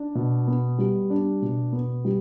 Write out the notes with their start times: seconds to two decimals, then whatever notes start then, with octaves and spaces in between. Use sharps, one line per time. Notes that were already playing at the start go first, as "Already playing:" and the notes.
Already playing: D4
0.15 B2
0.48 B3
0.78 G3
1.10 D4
1.42 B2
1.73 B3
2.05 G3